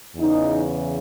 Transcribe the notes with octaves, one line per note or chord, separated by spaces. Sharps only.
E2 C#3 E3 D#4